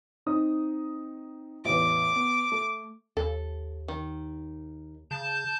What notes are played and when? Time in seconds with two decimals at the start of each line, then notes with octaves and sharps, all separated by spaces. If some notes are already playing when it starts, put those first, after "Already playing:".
0.26 C4 D#4 D#6
1.65 A1 E2 D6
2.16 B3
2.52 A3
3.17 D#2 A4
3.88 D#3
5.11 C#3 A5 G6